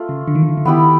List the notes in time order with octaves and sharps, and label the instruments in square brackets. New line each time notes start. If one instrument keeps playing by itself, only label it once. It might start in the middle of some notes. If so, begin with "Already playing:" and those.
Already playing: [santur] A3 F4
[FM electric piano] C#3
D3
D#3
D3
D#3
D3
[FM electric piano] D#3 [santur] B3 E4 G4